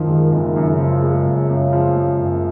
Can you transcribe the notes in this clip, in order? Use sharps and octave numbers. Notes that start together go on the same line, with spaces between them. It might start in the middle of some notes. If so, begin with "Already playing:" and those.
Already playing: F#2 D#3 F3
G#3
F#1 D#3
F#2
C#3
F3
G#3
F#1
F#2
F3
G#3
F#1